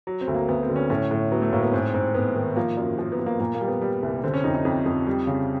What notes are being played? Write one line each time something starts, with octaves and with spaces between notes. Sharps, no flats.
F#3
C4
D2
A#3
D2 B3
C4
D3
C#4
A2 C#4
A2
F#3 B3
A3
A2 A#3
B3
G#2 C4
G#2 C4
G#2 B3
D#3
F3 A#3
F#2
F3
B3
F3
A#3
A#2 A#3
A#3
G3
B3
G3
C2
D3 C4
C#4
F2 D#4
D#4
F2
F2
G3
C#3